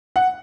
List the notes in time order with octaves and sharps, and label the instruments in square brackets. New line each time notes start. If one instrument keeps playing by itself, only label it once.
[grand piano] F#5